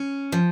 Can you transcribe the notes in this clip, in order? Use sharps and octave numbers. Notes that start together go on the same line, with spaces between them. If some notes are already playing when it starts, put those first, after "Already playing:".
Already playing: C#4
F3